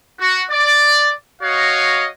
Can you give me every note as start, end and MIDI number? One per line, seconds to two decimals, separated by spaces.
0.20 0.43 66
0.51 1.12 74
1.42 2.07 66
1.42 2.07 73
1.42 2.07 75
1.42 2.07 77